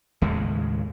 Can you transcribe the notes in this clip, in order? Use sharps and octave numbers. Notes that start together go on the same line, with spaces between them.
D#2 A2 C#3 G#3